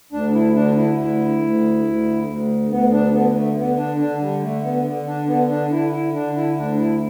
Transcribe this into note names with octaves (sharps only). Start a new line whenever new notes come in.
D2 D4
E4
D3 D4
E4
D2 E4
D2
D2
D2
D2 B3
D4
D3 B3
A3
D3 B3
D4
D3 D4
G3
D3 A3
B3
D3
D4
D3 B3
D4
D3 E4
E4
D3 D4
E4
D2 D4
E4